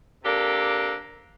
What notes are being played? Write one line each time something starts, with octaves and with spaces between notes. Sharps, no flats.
C3 A#3 D4 G4 A4